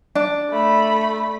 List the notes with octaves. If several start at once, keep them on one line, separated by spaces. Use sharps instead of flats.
D4
A3 B5